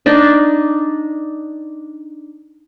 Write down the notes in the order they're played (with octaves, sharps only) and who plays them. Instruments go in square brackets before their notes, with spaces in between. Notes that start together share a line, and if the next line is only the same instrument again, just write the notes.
[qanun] D4 D#4